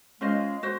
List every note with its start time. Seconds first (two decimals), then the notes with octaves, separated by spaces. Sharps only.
0.21 G#3 C#4 F4 C5 D#5
0.63 F#4 C5